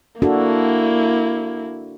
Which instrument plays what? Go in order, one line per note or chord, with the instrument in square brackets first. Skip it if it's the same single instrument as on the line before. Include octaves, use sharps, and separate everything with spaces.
[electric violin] A#3 E4 [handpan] D4 F#4 A4